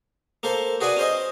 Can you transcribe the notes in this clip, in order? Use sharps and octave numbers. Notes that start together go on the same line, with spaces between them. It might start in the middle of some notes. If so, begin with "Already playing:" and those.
A#3 A4 C5
F#4 G#4 B4 D5 G#5
C#4 C5 D#5